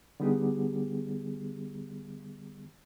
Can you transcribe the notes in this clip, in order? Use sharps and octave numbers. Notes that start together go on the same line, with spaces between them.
D3 G3 B3 D#4 G4 G#4